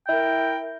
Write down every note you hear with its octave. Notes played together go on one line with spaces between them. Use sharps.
E4 A#4 G5